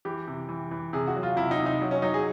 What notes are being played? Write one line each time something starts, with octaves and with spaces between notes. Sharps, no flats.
E3 G4
C3
E3
E3
C3 G#4
F#4
F#3
F4
C3 E4
D#4
C3
D#4
F#3
C#4
F#3 D#4
G#4